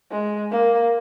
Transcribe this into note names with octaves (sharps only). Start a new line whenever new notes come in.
G#3
A#3